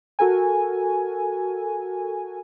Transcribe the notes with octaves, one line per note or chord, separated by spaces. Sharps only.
F#4 A4 A#4 G#5